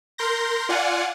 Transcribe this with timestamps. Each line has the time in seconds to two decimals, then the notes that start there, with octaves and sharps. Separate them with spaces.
0.18 A#4 C6 G6 A#6
0.69 F4 D5 F5 F#5 G#5